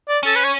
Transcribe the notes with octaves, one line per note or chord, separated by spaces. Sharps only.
D5
C#4 A4
B4
C#5